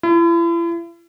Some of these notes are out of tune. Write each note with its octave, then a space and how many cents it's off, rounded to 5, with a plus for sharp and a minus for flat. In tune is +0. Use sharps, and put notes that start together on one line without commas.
E4 +40